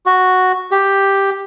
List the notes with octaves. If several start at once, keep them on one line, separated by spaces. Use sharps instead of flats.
F#4
G4